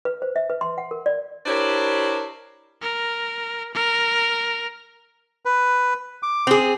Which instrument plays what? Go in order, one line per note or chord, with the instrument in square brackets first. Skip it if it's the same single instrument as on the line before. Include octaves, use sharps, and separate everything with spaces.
[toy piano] B4
C5
E5
B4
C6
F#5
A#4
D5
[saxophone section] D4 E4 G4 A#4 C5 C#5
[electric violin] A#4
A#4
[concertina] B4
D6
[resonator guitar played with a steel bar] C4 G#4